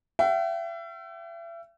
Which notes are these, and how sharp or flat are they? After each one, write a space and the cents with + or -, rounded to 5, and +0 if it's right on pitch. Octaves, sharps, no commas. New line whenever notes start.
E5 +35 G5 -45